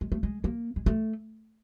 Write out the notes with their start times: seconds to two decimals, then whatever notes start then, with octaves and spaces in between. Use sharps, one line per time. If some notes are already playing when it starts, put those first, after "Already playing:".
0.01 G#3
0.12 A3
0.23 G#3
0.44 A#3
0.76 G#3
0.86 A3